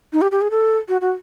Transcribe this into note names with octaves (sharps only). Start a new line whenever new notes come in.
D#4
G4
G4
G#4
A4
F#4
F#4